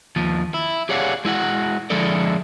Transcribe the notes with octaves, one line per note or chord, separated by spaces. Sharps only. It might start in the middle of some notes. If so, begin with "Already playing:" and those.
D#2 F3
E4
G4 G#4 C#5 D5 F5 F#5
G#3 E4 F#4 F#5
D3 F3 G#3 E4 A4 D5